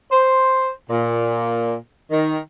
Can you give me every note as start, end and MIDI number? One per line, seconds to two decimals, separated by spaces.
0.11 0.70 72
0.89 1.74 46
2.11 2.38 51